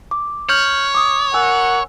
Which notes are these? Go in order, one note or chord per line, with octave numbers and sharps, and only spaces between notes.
D6
C#5 F6 G6 F#7
D6 D#6
A#4 F#5 G#5 E6